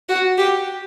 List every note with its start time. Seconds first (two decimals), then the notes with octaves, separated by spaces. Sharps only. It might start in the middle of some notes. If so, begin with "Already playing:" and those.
0.09 F#4
0.38 G4